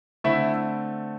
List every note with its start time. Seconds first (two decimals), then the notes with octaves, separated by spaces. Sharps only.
0.24 D3 A3 C4 E4 E5